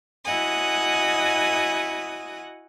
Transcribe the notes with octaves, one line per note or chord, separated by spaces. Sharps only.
E4 F#4 D#5 F#5 G#5 D#6